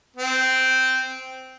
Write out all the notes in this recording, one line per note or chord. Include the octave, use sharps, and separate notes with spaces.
C4